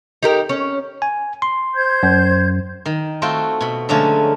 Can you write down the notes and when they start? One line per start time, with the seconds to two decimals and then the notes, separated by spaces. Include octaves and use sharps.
0.23 D#4 G4 A#4
0.49 C#4
1.02 G#5
1.42 C6
1.75 C5 G6 G#6
2.03 F#2
2.86 D#3
3.22 A3 C4 F4 F#4 G5
3.61 B2 B5
3.89 D3 F3 F#3 G#3 A3 C#4